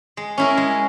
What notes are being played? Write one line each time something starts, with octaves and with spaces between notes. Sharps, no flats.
G#3
C#4 E4 A#4
G#3